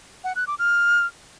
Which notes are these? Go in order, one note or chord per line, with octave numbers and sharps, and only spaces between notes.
F#5
F#6
D6
F6